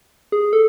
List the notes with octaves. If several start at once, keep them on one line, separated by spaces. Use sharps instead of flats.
G#4
A4